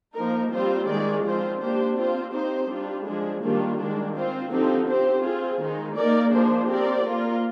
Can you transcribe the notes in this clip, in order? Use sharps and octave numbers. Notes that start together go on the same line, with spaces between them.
F3 A#3 D#4 A#4
G3 C4 F4 C5
D#3 G#3 D#4 G#4 D5
F3 C4 F4 C5
A#3 D4 G4 C5
C4 F4 C5
C4 D#4 G4 C5
G3 D4 F4
F3 G#3 D4 G#4
D#3 G3 A#3 D4 F4
D#3 G#3 D4
C4 F4 C5
D3 F3 C4 D#4 G4
C4 G4 C5
C4 F4 G#4
D#3 G#3 D#4
A#3 D#4 A#4 D5
F3 A#3 D4 G#4 C5
C4 G4 A#4 D5
A#3 F4 A#4